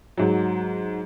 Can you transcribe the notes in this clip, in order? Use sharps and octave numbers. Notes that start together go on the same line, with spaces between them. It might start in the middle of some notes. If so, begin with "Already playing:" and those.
G#2 F#3